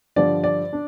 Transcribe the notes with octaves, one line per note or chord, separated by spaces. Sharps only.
G2 D3 F3 D5
D5
D4